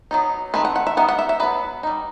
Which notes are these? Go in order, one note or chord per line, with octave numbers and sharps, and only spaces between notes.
F#3 B3 D#4
D#3 A3 C4 B4
F#5
F#5
E5
G3 B3 D#4 F#5
F#5
E5
E5
F#3 B3 D#4 B4
G3 D#4